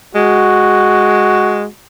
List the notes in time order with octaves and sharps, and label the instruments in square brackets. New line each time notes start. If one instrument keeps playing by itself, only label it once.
[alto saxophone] G#3 [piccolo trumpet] F#4